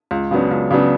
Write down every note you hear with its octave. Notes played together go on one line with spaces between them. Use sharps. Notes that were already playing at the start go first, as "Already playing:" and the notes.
C#2
C#3 F#3 B3 D4
C#2
C#3 F#3 B3 D4